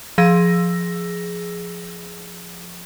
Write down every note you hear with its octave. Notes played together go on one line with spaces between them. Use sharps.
F3 G#4 E6 A#6